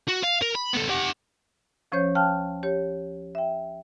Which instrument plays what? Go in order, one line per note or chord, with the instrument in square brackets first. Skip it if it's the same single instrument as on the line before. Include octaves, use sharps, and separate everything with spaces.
[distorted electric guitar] F#4
F5
A#4
B5
B3 A4
G4 F#5
[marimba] D2 F3 C#4 C5 C#5 G6
F5 G5 A5 F6 F#6
G4 C#5
E5 G5